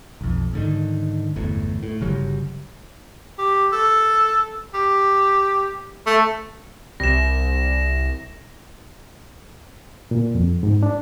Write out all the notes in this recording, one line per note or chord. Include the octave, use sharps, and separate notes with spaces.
B1 F2
G#2 D3 D#3
G1 E2 A2
A2
G1 C#3 F#3 G3
G4
A4
G4
A3
C2 A#6 E7
A#2
F2
G#2
D4